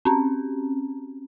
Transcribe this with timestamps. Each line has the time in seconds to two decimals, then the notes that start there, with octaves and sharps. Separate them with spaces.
0.05 C4 C#4